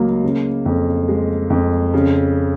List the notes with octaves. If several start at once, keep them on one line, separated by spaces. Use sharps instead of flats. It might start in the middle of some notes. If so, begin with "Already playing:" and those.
Already playing: C#2 F#3 A#3
C#3
F2
G#3
F2
C#3